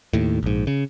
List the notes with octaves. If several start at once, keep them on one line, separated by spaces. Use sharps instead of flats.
D#2 A2
A#1 G#2
C#3